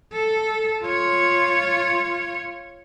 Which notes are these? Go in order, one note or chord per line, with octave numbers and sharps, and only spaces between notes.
A4
F4 C#5